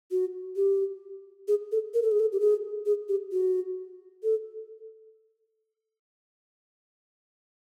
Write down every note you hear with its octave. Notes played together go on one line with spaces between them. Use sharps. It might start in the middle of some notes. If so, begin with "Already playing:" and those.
F#4
G4
G#4
A4
A#4
A4
G#4
A4
G4
G#4
G#4
G4
F#4
A4